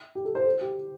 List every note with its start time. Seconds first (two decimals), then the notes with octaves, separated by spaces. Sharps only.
0.15 G4
0.25 A4
0.35 C5
0.45 A4
0.61 G4